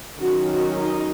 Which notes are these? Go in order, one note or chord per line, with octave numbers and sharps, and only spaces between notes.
D#3 F#3 C#4 F#4
F#4
D#4